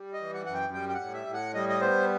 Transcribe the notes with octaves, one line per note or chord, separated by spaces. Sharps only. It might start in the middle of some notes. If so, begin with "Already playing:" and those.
Already playing: G3
D#5
E3
F#5
F#2 F#5
G5
G3 G5
G5
F#5
A2
E5
A2
F#5
G3 D#5
D#5
B3 C5